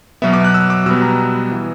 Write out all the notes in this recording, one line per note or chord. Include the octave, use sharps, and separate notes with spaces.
B2 F#3 B3 E5
D6
F#6
E6
D6
B2 G3 B3 E6
A#5
E3 B3